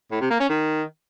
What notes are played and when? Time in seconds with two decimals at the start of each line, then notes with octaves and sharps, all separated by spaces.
0.11 A2
0.21 C3
0.30 A#3
0.40 C#4
0.49 D#3